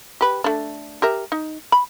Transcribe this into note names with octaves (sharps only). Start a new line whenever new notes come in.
G4 B4
A3 D4
G4 A#4 E5
D#4
B5